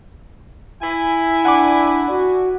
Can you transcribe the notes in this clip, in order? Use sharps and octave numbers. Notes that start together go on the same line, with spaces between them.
E4 G#5
D4 F#5 B5 D6
F#4